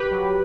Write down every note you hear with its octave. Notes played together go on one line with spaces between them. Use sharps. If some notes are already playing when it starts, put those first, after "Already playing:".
Already playing: G4 B4
F#3